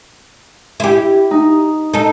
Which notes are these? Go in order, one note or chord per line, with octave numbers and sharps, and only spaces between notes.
E4 G4
D#4
D#4 A4